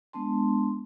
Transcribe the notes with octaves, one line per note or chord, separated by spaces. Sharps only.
G#3 B3 D4 A5 C6